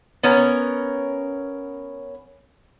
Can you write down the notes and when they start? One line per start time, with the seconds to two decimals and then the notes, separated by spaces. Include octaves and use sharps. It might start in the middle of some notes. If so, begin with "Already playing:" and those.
0.24 B3 C#4 A#4